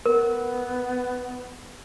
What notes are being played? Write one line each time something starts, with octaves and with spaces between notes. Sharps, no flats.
B3 A#4